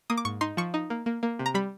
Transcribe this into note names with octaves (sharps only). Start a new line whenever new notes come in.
A#3 D#6
D6
G#2 C#6
D#4 C6
F3 C#6
D#4
A#3
A#3
A#3
C3
A#5
G3 B5